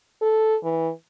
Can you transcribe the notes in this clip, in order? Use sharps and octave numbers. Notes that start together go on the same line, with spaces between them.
A4
E3